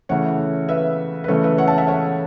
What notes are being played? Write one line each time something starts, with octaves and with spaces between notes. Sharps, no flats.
C#3 E3 A3 C#5 F#5
B4 E5
B4
C#3 E3 A3 A4 C#5
B4 E5
C#5 F#5
E5 A5
E5 A5
C#5 F#5